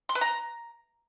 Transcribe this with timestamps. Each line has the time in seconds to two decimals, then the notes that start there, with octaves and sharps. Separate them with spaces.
0.09 C6
0.15 B4
0.21 A#5